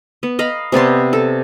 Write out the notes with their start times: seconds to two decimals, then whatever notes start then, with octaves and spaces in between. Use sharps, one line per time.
0.23 B3
0.39 D#5 F5 A#5 B5
0.72 C3 B3 D5 C6
1.13 A4